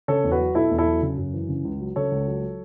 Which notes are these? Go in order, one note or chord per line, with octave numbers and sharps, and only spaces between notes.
C#3 A4 C#5
E2
F#4 B4
F#3
B2 E4 A4
E2
E4 A4
F#3
C#3
F#2
E3
C#3
C#2
F#3
C#3 A4 C#5
C#2
F#3
F#3